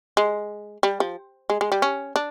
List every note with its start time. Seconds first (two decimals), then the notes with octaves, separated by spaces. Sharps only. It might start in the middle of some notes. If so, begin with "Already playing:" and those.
0.17 G#3
0.83 G3
1.00 F3
1.50 G#3
1.61 G#3
1.72 G3
1.82 C#4
2.16 D4